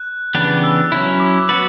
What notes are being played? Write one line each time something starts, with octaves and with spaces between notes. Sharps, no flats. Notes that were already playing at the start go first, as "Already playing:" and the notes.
Already playing: F#6
C#3 E3 B3 D4 G4 F#6
E6
F#3 C#4 E4
D6
F#3 B3 F#4 B4 A6 C#7